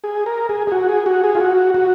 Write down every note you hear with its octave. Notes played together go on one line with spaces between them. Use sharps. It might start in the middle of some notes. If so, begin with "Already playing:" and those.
G#4
A#4
G#4
G#4
F#4
G#4
F#4
G#4
F4
F#4
F#4